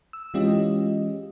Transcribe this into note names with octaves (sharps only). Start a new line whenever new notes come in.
E6
E3 G#3 C#4 F4 G4 D#5